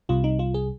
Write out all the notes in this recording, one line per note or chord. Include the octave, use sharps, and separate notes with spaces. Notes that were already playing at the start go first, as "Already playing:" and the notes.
C2 C3 G3 F4
D#4
F4
G#4